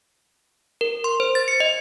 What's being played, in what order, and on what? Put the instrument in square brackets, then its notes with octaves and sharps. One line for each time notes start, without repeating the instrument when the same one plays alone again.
[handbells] A#4
C6
C5
A6
C#7
D#5